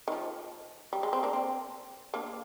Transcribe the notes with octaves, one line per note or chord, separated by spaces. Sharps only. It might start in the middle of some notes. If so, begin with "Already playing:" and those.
D#3
F3
G3
G#3
C4
A#3 D4
C4
A#3 D4